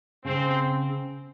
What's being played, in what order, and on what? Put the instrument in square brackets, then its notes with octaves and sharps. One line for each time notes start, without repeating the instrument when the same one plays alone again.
[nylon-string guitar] C#3 [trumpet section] C4